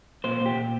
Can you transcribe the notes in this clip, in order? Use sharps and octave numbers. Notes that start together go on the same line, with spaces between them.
A#2 C5
A#2 G4
A#2